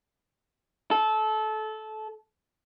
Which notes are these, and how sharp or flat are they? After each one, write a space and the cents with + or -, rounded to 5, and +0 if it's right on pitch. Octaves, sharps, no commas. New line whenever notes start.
A4 -20